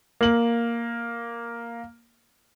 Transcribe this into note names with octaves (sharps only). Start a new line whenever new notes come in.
A#3 F#7